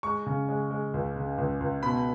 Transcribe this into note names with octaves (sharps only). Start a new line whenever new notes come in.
G#3 C#6
C#3
G#3
G#3
C#2
C#3
C#2
C#2
B2 B5